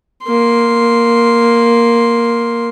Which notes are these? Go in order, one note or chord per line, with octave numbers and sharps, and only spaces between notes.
A#3 C6